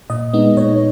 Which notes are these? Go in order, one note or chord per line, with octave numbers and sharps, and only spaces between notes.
A#2 D#5
G#3 B3 D#4
A#2 C#5